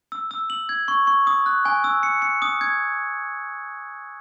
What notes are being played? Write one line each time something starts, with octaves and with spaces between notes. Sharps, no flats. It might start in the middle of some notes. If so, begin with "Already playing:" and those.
E6
E6
F#7
G#6
C#6
C#6
D#6
F#6
G#5
E6
C#7
C#7
D#6
G#6